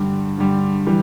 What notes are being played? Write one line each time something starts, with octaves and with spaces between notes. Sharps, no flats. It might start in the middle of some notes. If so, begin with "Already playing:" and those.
Already playing: G2 D3 G3
G2 D3 G3
E3 G3